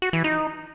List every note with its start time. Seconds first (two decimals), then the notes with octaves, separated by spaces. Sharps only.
0.02 F#4
0.13 E3
0.24 D#4